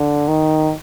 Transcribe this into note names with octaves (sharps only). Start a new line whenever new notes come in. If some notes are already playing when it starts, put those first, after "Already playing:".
Already playing: D3
D#3